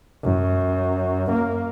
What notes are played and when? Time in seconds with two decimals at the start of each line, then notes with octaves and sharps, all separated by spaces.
0.23 F#2
1.32 A#3